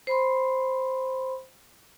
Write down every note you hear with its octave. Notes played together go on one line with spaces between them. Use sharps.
C5 B5 C6